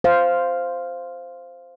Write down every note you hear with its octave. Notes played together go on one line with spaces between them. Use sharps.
C5 F5